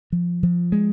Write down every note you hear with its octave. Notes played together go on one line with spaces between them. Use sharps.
F3
F3
G#3